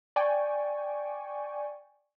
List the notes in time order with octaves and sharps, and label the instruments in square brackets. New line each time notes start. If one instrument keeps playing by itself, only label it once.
[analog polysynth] D5 G5 G#5 C#6